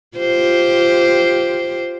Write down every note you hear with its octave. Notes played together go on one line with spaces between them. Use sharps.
F4 G4 C5